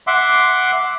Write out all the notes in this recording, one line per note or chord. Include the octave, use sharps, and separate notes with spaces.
E5 F#5 C6 D6